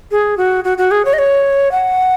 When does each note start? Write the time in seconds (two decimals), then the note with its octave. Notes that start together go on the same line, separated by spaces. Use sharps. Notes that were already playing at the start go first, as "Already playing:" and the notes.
0.11 G#4
0.37 F#4
0.64 F#4
0.78 F#4
0.91 G#4
1.05 C#5
1.13 D#5
1.19 C#5
1.72 F#5